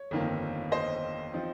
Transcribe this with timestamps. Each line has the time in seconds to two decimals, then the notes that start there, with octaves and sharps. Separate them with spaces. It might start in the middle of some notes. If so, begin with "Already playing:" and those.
Already playing: C#5
0.11 G1 F2 D#3 A#3
0.72 C5 D#5
1.33 F3 C4 D#4